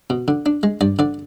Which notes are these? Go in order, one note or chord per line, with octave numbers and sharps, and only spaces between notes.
B2
D3
D4
G#3
G2 D5
D3 D5